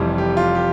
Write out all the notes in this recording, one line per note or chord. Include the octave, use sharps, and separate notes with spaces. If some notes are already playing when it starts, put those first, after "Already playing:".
Already playing: F1 F2 E3 G3
G4
F4
G4